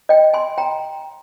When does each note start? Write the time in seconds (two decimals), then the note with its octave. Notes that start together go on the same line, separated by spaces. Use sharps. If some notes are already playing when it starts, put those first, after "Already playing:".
0.09 D#5 G5
0.34 G#5 C6
0.58 G5 A#5